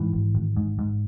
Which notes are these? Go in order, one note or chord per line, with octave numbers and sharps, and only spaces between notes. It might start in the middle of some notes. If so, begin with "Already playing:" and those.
Already playing: G#2 E3
G#1
G#1
G#2
G#2